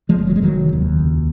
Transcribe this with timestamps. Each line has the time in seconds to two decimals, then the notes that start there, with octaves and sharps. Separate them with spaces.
0.09 F3 G#3
0.18 F1
0.27 F#3
0.36 G#3
0.42 F1 D#3 F#3
0.73 D#2
0.99 C#2